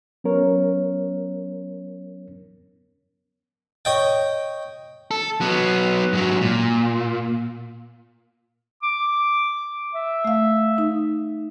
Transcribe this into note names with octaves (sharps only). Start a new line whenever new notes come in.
F#3 B3 C#4 A#4 C#5
C#5 D#5 G5
A4
F#3 B3
G#2 F#3
A#2
D6
E5
A3 F5
D#4